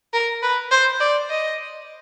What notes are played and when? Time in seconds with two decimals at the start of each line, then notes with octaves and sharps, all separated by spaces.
0.13 A#4
0.42 B4
0.71 C5
1.00 D5
1.29 D#5